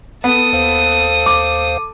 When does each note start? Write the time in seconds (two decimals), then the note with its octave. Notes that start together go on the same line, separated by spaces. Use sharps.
0.24 B3 A4 D#6
0.53 D#2 C5 F5
1.26 D6